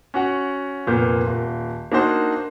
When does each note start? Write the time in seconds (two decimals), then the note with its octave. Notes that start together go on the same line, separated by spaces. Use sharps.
0.14 C#4 F#4 F#5
0.87 F1 A#2 A#3 B3 G6
1.27 D#1
1.92 A#3 D4 D#4 F#4 C5